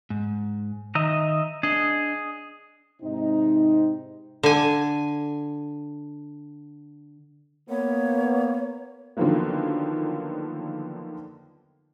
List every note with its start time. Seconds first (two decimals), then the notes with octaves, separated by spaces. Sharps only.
0.10 G#2
0.95 D#3 D#5 E5 A#5
1.63 D4 G#4 D#5
3.02 G#2 C3 C4 D#4
4.43 D3 G#5
7.70 A#3 B3 C#5
9.17 D3 D#3 F3 F#3 A#3 B3